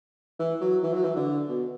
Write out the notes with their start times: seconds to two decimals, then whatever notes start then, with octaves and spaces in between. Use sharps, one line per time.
0.39 E3
0.61 F#3
0.83 E3
0.93 F#3
1.04 E3
1.16 D3
1.48 B2